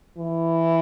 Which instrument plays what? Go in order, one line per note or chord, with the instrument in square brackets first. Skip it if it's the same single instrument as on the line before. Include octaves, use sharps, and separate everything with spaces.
[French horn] E3